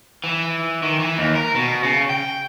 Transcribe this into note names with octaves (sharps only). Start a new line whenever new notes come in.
E3
D#3
E3
D#2
A#4
B2
C#3
G5